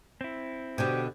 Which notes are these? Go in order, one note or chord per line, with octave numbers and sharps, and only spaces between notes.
C4 E4
B2 D3 G4 C5 G6 G#6